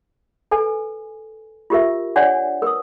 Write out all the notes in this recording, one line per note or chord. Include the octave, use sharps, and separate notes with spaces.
A4 B4 G#5
F4 G4 A#4 E5
D4 C#5 D5 F#5 G#5
A#4 B4 D#6